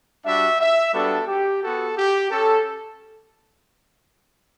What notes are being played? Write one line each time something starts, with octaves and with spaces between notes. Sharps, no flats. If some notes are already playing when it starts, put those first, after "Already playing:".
G3 D4 F#4 E5
E5
G3 B3 D4 F#4 A4
G4
B3 F#4 A4
G4
C#4 G4 A4